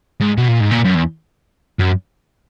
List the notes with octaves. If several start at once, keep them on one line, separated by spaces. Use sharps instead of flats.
G#2
B2
A#2
G#2
A#2
F#2
E2
F#2